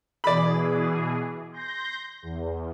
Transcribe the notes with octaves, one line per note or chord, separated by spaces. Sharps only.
B2 E3 G#4 D5 B5
C6 G6 A#6
E2